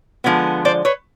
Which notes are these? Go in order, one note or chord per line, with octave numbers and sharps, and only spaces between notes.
D3 F3 G#3 B3
C5 D5
B4 C#5